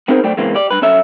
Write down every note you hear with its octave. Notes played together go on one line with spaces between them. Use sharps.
B3 C4 D#4 G#4 A#4 C5
D2 F#3 A3 C5 D5 G5
E2 C#3 E3 G#3 A#3 C4
G4 D5
G2 B4
F#2 C#4 A4 E5